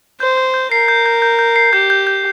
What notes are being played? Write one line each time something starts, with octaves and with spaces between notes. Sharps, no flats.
C5 G6
G6
G6
A#4 C7
G6
G6
G6
G6
C7
G4 G6
G6
G6